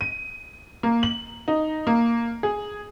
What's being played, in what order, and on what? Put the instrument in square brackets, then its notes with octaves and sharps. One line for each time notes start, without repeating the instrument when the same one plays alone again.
[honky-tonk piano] D#7
A#3
F#7
D#4
A#3
G#4